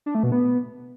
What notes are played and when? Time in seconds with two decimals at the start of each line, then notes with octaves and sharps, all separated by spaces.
0.06 D4
0.15 A3
0.23 B2
0.32 B3